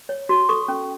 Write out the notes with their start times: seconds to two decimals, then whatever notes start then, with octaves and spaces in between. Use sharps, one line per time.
0.09 C#5
0.29 F#4
0.49 A4 C#6
0.68 C#4